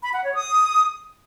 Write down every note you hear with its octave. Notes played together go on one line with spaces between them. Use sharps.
B5
F#5
C#5
D#6